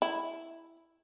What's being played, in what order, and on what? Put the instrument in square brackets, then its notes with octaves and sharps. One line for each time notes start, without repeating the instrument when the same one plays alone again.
[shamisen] E4